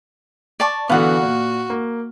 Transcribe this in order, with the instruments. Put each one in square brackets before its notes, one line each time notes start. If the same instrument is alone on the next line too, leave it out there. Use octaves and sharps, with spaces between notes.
[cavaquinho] D5 A5 C#6
[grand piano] D3 E3 B3 [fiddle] F#4 [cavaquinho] F5 F#5
[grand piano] A#2
A#3